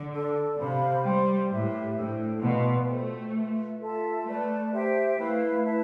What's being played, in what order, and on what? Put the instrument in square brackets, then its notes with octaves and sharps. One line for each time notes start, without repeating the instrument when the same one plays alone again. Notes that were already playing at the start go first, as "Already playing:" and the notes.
Already playing: [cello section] D3
[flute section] D4 A4 D5
[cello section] C3 [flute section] C5 F5 B5
[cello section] G3 [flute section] C5 G5 C6
[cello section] A2 [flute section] G4 B4 E5
[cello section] A2 [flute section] D4 A4 C5 G5
[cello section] B2 [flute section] B4 D5 F5 C6
[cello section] A3 [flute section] F4 A4 C5 G5
[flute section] F4 B4 E5
F4 A4 E5 A5
[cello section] A3 [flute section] B4 D5 A5
[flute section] G4 C5 E5 G5
[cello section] A3 [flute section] E4 B4 F5
[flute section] E4 B4 E5 A5